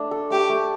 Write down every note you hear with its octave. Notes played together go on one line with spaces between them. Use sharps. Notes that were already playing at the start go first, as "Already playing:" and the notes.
Already playing: A3 D4
A4
A3 G4
A3